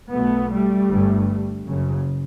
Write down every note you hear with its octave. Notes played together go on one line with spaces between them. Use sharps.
B1 B2 A3 B3
G3 A3
G1 G2
F#1 F#2 C#3